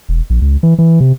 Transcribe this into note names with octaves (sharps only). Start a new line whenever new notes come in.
E1
A#1
C#2
E3
E3
C3